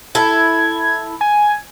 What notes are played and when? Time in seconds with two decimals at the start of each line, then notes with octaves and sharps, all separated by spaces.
0.15 E4 A4 G#6
1.21 G#5